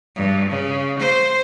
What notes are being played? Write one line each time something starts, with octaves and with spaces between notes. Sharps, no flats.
G2
C#3
C5